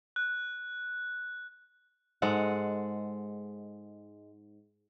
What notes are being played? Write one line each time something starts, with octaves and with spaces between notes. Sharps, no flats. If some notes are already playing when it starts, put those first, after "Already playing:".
F#6
G#2 G#3 A4 F#5